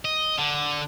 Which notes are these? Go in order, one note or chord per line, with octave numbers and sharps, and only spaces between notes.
D#5
D3